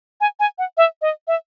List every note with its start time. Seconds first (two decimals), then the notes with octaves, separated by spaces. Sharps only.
0.21 G#5
0.40 G#5
0.58 F#5
0.77 E5
1.02 D#5
1.28 E5